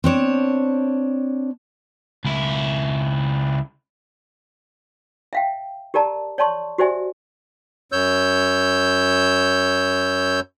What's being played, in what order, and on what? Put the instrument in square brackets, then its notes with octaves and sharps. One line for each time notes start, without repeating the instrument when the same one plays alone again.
[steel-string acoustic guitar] C4 D4 C#5
[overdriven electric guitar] C#2 E4
[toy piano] E5 F5 G5
G4 A#4 D5 A5 A#5
C#5 D5 A5 C6 C#6
F#4 G4 C5 D5 E5 G#5
[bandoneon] F#2 C#5 E6 G6